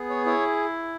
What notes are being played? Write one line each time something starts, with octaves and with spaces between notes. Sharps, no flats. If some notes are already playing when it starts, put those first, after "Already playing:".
Already playing: B3 G#4
C#5
E4 C#5